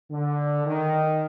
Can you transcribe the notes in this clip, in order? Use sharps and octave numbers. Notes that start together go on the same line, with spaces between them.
D3
D#3